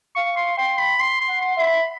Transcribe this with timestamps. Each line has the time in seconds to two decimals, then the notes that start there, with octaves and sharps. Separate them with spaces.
0.15 F5 C#6
0.37 C6
0.57 G5 C6
0.78 B5
1.00 C6
1.21 C6
1.28 F#5
1.42 C6
1.57 E5
1.63 B5